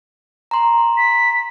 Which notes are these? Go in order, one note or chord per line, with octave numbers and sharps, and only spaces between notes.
A#5 C6
B6